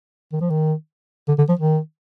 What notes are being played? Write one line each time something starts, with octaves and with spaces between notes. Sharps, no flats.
D#3
F3
D#3
D3
D3
F3
D#3